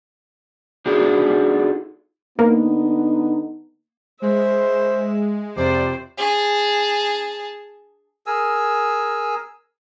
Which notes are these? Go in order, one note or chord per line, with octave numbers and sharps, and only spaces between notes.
D4 D#4 F4 F#4 G#4 A4
D3 A#3 B3 D#4
G#3 C5 E5
F2 C3 C5 D5
G#4 A5
G#4 A#4 G#5 E6